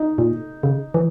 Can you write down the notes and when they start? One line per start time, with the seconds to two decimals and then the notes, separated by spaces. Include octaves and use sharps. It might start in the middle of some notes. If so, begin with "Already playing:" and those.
Already playing: D#4
0.18 A#2
0.63 C#3
0.94 E3